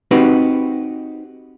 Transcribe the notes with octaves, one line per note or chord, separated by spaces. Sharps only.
C4 D#4 F#4 G4 B4